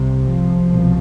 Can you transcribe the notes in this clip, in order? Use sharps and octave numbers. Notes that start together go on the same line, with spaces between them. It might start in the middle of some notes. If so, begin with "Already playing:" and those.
Already playing: C2 C3
F3
C2 B2